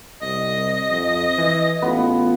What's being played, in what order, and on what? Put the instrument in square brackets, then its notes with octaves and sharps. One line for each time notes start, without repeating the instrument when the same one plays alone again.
[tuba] C2 [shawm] D#5
[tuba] F2
E3
[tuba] A1 [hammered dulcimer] B3 F4 G#4